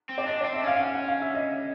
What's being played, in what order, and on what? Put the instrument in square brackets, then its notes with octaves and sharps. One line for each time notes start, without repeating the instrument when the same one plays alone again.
[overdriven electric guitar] C4
[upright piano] D5
[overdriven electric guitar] D4 [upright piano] D#5
[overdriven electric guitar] C4 [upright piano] D5
[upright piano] E5
[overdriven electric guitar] C#4 [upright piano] F5
[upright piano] F5
F#5
F#5
F5
E5
D#5